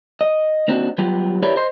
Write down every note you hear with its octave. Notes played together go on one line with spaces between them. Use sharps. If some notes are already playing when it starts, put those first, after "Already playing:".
D#5
A#3 C4 D4 D#4 F#4
F#3 G3 B3 F4 G4
E4 G4 A#4 B4 C#5 D5
C5 D#5 C6